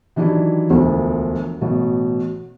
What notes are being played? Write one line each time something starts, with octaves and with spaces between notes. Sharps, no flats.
D#3 E3 F#3 D4 E4 G4
E1 D2 F3
A1 B2